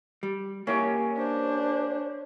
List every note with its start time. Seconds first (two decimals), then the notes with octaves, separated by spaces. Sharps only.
0.23 G3
0.67 A#3 C#4 E4 G4
1.18 D4 C5